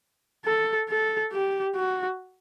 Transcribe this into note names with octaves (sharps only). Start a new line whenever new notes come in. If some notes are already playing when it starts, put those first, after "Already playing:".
A4
A4
G4
F#4